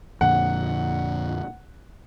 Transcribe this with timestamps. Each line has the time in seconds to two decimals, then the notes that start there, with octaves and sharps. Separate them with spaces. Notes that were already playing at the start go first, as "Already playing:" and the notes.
0.21 F2 A#2 D3 F#5